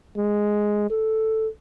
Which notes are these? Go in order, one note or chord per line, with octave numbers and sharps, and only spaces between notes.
G#3
A4